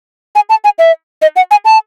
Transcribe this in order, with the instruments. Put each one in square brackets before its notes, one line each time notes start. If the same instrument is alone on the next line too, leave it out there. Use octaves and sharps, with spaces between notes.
[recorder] G#5
A5
G#5
E5
D#5
F#5
G#5
A5